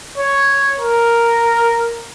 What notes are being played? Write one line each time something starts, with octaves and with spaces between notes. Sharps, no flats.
C#5
A#4